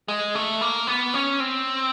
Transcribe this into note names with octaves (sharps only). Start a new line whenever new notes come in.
G#3
A3
A#3
B3
C#4
C4